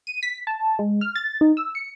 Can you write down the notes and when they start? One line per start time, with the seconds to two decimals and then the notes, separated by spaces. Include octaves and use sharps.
0.07 D#7
0.23 B6
0.47 A5
0.79 G#3
1.01 F6
1.16 A6
1.41 D#4
1.57 E6
1.75 C#7